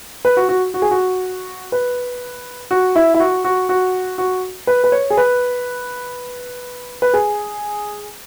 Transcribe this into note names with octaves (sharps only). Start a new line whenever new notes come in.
B4
F#4
F#4
F#4
G#4
F#4
B4
F#4
E4
E4
F#4
F#4
F#4
F#4
B4
B4
C#5
G#4
B4
B4
G#4